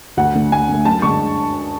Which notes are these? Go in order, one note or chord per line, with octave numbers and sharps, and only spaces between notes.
D2 F#5
D3 A3
D2 G#5
D3 A3
F#2 A5
D3 G#3 C#6